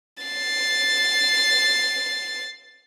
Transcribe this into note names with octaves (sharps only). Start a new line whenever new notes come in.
A6 C7